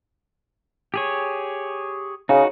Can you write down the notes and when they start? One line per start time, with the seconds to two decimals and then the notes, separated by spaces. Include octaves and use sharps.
0.94 G4 G#4 C#5
2.29 C#3 D#4 F#4